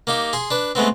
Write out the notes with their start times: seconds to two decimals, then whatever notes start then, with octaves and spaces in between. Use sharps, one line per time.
0.07 A#3 D#4 G4
0.33 G#4 C6
0.51 D4 B4
0.75 G#3 A3 B3 C4